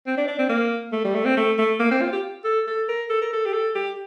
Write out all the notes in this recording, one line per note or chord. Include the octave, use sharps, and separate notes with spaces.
C4
D4
D4
C4
A#3
A3
G3
A3
C4
A3
A3
A#3
C4
F4
G4
A4
A4
A#4
A4
A#4
A4
G4
A4
G4